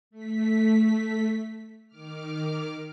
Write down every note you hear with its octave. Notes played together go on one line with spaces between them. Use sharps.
A3 B6
D#3 D6 F6